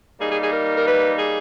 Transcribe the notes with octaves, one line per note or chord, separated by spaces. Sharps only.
G3 A#3 D#4 G#4
G#4
G#4
A#4
A#4
B4
G#4